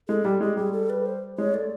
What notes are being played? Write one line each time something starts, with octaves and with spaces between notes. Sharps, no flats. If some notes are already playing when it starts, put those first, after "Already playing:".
G#3 A4
G3 G4
G#3 G4
G3 G#4
A4
B4
C5
G#3 C#5
A3 D5